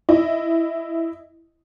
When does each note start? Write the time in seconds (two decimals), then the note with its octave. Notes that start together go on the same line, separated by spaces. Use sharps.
0.09 E4 D#5